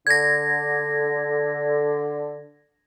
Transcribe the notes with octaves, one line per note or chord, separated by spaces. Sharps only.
D3 G#6 A#6